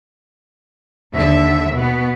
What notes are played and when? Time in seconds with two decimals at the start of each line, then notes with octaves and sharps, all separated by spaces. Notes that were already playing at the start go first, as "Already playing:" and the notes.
1.13 D#2 D3 E5
1.73 B2 B3